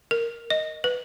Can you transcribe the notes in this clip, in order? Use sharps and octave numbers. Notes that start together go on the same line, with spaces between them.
A#4
D#5
B4